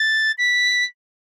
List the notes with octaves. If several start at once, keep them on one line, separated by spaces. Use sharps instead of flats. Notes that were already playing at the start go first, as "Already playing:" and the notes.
Already playing: A6
B6